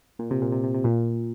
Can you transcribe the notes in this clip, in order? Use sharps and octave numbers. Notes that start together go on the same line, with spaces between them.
A#2
C3
A#2
C3
C3
C3
A#2